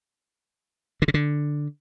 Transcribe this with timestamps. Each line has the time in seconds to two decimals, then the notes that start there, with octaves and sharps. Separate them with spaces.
1.02 D3
1.08 C#3
1.14 D3